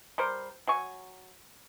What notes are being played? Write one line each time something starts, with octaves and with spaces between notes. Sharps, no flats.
G3 A#4 C5
F#3 G#5 C#6